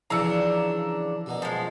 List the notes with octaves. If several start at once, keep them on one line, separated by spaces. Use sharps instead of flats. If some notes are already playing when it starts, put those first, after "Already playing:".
C#3 E3 F3 D4 A#5 E6 C#7
F#2 B2 D3
F3 G#3